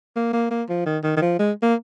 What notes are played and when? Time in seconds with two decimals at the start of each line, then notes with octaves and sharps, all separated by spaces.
0.16 A#3
0.33 A#3
0.51 A#3
0.69 F3
0.86 D#3
1.04 D#3
1.17 D#3
1.22 F3
1.39 G#3
1.62 A#3